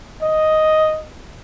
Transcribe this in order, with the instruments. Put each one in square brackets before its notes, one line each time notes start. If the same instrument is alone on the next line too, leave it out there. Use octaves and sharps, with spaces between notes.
[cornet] D#5